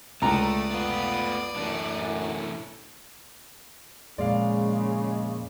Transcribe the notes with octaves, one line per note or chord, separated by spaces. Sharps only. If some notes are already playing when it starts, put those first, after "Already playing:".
C#2 A3 D5 A#5 D#6
A3 B3 F4
F#2 E3 A3 D4
F2 A#2 C#3 G#3 D5 F5